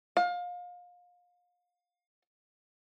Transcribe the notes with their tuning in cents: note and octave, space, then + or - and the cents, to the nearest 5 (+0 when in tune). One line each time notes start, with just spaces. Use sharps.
F5 +30